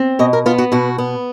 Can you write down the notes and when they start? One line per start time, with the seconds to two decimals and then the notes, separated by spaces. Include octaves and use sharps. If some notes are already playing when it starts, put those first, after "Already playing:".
Already playing: C4
0.19 B2 D#5
0.33 A#4
0.46 B3 F4
0.58 F#4
0.72 B2 F#4
0.98 B3